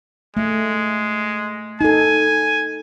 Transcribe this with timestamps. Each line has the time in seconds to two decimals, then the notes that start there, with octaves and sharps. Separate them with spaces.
0.37 G#3 A3
1.81 D#4 A4 G#5